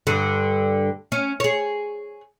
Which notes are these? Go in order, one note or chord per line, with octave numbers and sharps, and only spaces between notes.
G2 D3
C#4
G#4 C#5